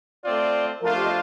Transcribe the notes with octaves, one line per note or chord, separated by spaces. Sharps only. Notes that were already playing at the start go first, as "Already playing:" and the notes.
A3 C4 F4 D5
F3 A3 D4 F4 A#4 C5
G4
D#5